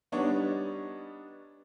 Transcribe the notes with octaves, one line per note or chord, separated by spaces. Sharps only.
G3 B3 D4 D#4 C#5